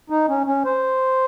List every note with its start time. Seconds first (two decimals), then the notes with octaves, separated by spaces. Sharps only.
0.10 D#4
0.28 C#4
0.47 C#4
0.65 C5